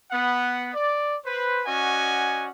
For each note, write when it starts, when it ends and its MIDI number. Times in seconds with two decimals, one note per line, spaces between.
0.12 0.70 59
0.12 0.70 78
0.74 1.17 74
1.25 1.61 71
1.25 1.61 72
1.66 2.49 61
1.66 2.49 66
1.66 2.49 74
1.66 2.49 75
1.66 2.49 78
1.66 2.49 80